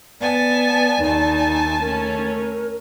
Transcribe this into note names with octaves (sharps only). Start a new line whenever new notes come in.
B3 D5 G#5 A5
D#2 D#4 G#5 A5
A3 C#4 A#4